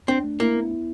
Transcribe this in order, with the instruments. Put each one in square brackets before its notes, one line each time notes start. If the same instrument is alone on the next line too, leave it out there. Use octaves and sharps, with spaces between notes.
[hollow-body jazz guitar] C4 [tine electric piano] D4
[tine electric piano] A3
[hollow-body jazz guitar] A#3 [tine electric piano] E4
[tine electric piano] B3
E4